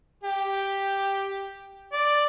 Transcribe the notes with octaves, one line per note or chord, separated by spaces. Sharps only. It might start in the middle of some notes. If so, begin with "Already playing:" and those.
G4
D5